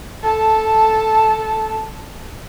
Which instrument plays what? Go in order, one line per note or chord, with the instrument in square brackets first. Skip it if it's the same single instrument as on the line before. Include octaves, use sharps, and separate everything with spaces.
[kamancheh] A4 A5